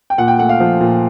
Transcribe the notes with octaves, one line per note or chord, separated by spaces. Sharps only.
G5
A#2 F#5
G5
A3 F#5
F5
F3
A#2